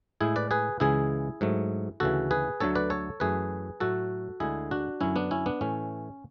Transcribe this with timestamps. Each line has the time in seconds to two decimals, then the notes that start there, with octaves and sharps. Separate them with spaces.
0.21 A2 G#3 E4 G#4
0.36 B4 D5
0.51 G#4 B4
0.80 C#2 C#3 E3 G#3 E4 G#4
1.41 G#2 F#3 A3
2.00 D2 C#3 E3 F#4 A4
2.31 G#4 B4
2.60 D2 D3 F#3 A3 A4 C#5
2.75 B4 D5
2.90 A4 C#5
3.20 F#2 E3 A3 G#4 B4
3.80 A2 F#3 A3 F#4 A4
4.40 D2 D3 G#3 E4 G#4
4.71 D4 F#4
5.01 F#2 D3 F#3 C#4 E4
5.16 B3 D4
5.31 C#4 E4
5.46 B3 D4
5.61 A2 E3 A3 C#4